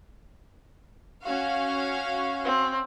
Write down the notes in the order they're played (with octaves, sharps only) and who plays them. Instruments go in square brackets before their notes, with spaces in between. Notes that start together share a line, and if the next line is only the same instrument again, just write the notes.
[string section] C#4 F#4 F5
[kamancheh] C4